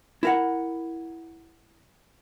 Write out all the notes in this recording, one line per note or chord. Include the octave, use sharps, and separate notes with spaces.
E4 A#4 F#5